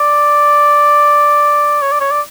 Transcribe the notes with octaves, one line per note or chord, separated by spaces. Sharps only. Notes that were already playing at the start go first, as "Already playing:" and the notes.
Already playing: D5
C#5
D5
C#5
D5